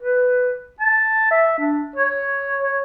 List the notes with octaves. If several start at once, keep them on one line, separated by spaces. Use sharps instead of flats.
B4
A5
E5
D4
C#5
C#5